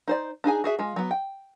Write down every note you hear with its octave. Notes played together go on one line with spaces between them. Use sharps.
D#4 C5 D5
D4 D#4 G#4 G#5
F#4 G#4 E5
G#3 F4
F#3 B3
G5